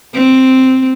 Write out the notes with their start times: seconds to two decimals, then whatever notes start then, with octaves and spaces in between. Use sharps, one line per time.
0.14 C4